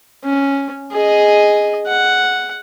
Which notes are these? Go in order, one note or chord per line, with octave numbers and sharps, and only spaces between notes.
C#4
G#4 D#5
F#5